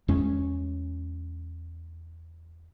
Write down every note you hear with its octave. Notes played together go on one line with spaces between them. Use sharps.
E2 G#3 C#4